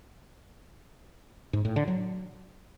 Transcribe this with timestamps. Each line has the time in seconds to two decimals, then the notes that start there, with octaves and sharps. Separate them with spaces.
1.53 G#2
1.65 A2
1.76 D3
1.88 F#3